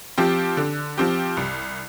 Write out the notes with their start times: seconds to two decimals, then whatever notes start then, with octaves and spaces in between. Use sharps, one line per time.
0.18 F3 C4 G4
0.57 D3
0.98 F3 C4 G4
1.37 C2